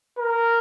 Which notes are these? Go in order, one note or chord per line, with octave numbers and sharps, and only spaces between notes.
A#4